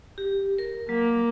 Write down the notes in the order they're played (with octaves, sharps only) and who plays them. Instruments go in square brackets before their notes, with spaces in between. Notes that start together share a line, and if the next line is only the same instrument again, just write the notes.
[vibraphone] G4
A#4
[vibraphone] F#3 [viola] A#3